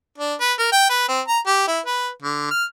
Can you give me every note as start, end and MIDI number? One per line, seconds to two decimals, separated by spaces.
0.18 0.34 62
0.41 0.53 71
0.59 0.69 70
0.72 0.87 79
0.90 1.06 71
1.09 1.21 60
1.28 1.39 82
1.47 1.68 67
1.68 1.80 64
1.86 2.10 71
2.22 2.47 50
2.51 2.64 89